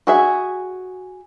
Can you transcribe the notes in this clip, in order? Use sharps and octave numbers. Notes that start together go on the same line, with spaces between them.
F#4 G#4 E5